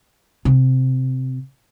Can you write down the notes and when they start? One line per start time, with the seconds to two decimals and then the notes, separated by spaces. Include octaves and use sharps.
0.45 C3